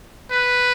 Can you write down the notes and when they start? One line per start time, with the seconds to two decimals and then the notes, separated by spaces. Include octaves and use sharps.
0.31 B4